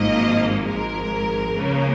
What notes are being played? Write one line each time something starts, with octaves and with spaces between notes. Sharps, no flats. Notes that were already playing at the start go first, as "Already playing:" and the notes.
Already playing: G#1 G#2 F3 A#3 D#5
G#1 G#2 F3 G#3 A#4
C#2 C#3 F3 A#3